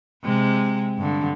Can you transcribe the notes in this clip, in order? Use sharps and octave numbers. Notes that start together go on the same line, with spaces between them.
C3 G#3
G2 D3